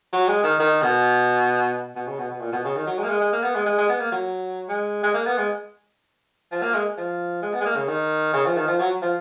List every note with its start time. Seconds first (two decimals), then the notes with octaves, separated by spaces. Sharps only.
0.13 F#3
0.28 G#3
0.43 D#3
0.59 D#3
0.82 B2
1.96 B2
2.07 C#3
2.19 B2
2.30 B2
2.41 A#2
2.52 B2
2.64 C#3
2.75 D#3
2.87 F#3
2.98 G#3
3.04 A#3
3.09 G#3
3.21 G#3
3.33 A#3
3.43 B3
3.55 G#3
3.66 G#3
3.78 G#3
3.89 B3
4.00 A#3
4.12 F#3
4.69 G#3
5.03 G#3
5.14 A#3
5.26 B3
5.38 G#3
6.52 F3
6.62 A#3
6.75 G#3
6.97 F3
7.42 G#3
7.54 B3
7.60 G#3
7.66 A#3
7.76 C#3
7.88 D#3
8.33 C#3
8.46 F3
8.57 D#3
8.68 F3
8.80 F#3
9.02 F3